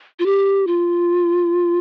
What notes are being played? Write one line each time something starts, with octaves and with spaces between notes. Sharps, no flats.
F4
G4
F4